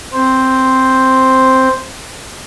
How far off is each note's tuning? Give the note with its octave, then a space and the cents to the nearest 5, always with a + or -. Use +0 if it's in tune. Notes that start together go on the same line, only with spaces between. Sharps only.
C4 +0 C5 +0